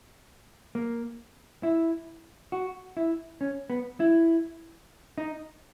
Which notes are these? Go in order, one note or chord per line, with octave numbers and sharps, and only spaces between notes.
A#3
E4
F#4
E4
C#4
B3
E4
D#4